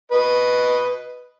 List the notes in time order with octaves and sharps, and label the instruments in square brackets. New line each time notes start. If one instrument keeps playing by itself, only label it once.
[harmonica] B4 D#5